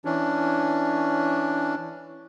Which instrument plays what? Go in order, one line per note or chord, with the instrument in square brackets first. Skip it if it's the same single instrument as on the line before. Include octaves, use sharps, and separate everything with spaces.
[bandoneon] E3 C#4 D4